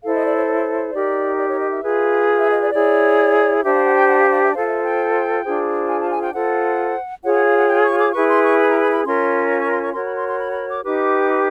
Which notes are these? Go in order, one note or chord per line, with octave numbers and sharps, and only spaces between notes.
E4 A4 C5 F5
D#5
D5
C#5
C#5
D#4 G4 A#4 D5
D5
C#5
D#5
E5
F4 G#4 B4
E5
D#5
D5
E4 G#4 C#5 D5
D4 G4 C5 E5
F5
F#5
G5
F#5
F5
F5
E5
F4 A4 C5 F5
E5
G5
D4 F4 G#4 C5
G#5
A5
G#5
G5
F4 A4 C5 F#5
F4 G#4 C#5 F#5
F#5
F5
F#5
G5
C#6
D6
E4 G#4 B4 C#6
C6
C#6
B5
A#5
B5
B5
C#4 F4 A#4 C#5 C6
C#6
C#6
C6
C#6
F#4 A#4 C#5 C6
B5
C6
C6
B5
B5
D6
D#4 G4 B4 D6